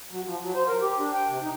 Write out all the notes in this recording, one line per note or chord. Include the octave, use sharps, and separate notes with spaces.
F#3
F3
F#3
C5
A#4
G4
D4
G5
C3
D#4